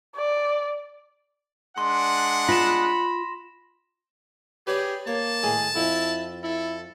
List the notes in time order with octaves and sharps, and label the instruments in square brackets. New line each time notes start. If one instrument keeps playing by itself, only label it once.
[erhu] D5
[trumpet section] G#3 D4 F#5 [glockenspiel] C6
[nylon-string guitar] F4 [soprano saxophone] B5 [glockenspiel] A#6 E7
[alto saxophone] G4 [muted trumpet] G#4 [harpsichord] B4 C#5 D5
[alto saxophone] A#3 [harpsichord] C#5 [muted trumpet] A5
[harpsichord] A2 D#3 G#4
[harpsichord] F2 [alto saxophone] E4
[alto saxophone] E4 [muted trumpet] A4